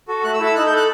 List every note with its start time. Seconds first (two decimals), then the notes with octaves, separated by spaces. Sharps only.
0.08 F#4 A4
0.24 A3 F#6
0.34 E6
0.39 E4 A4
0.46 E6
0.55 D#4 F#6
0.67 G6
0.72 A4 F#6